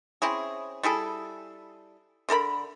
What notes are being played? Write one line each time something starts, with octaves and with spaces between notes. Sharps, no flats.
C4 C#4 E4 G#4
G3 E4 G#4 A4
D3 A4 A#4 B5